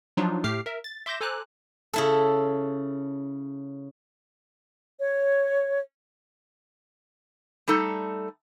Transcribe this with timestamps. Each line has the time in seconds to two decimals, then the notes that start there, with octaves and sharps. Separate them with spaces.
0.17 F3 F#3 D4 D#4 F4
0.44 A2 A3 G4 D6 F6 C7
0.66 A#4 E5
0.84 A6
1.06 E5 C6 D6 G6 A#6 E7
1.21 A4 C5 G#5 A#5 D6 F#6
1.93 C#3 E4 A4
4.99 C#5
7.68 G3 A3 D#4 A4